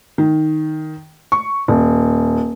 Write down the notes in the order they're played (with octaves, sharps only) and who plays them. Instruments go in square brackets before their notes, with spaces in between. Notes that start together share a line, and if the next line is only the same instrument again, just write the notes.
[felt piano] D#3
C#6
D#1